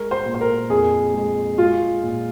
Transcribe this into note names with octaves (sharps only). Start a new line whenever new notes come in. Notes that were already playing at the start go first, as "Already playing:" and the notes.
Already playing: G#3 A#4
C5
A#2
C5
A#4
F2 G#4
G#3
G#3 F4
A#2